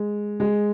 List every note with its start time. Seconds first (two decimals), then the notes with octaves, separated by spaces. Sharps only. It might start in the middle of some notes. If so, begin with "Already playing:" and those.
Already playing: G#3
0.40 G#3